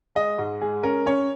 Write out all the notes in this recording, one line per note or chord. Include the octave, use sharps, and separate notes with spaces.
G#3 D#5
G#2
G#3 G#4
C#4 A#4
C#4 C#5